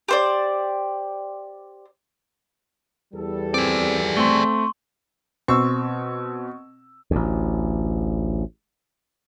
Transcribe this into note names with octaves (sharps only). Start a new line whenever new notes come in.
G4 C5 D5
E2 G3 A4
C4 G#4 D5
A3 C4 C6 C#6
B2 C4 C#6 E6
A1 D2